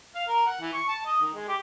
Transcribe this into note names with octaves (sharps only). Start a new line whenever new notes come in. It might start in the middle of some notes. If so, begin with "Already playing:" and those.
F5
A#4
F#5
E3
C#6
A5
D#5
D#3
G#3
G4